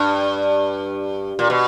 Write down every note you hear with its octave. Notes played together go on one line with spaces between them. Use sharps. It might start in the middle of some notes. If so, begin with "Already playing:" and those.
Already playing: G2
A#2
B2